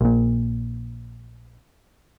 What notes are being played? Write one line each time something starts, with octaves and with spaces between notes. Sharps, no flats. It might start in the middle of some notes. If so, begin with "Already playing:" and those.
A#1 A#2